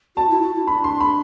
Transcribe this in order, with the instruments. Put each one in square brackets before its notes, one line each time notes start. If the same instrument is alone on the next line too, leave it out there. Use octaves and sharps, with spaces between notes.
[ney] F#4 [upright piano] A5
[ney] E4
F#4
E4
[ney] D4 [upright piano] B5
[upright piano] C6
B5